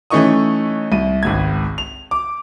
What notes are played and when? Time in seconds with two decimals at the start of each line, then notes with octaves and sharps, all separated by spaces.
0.10 E3 A3 C#4 D#4 C#6 D#6
0.92 C2 D#7
1.23 G#1 C#2 G#6
1.78 F7
2.11 D6